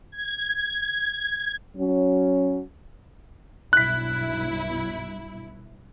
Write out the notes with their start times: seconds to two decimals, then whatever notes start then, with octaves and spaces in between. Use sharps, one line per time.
0.11 G#6
1.77 F#3 C#4
3.73 B1 G2 E4 F#6 B6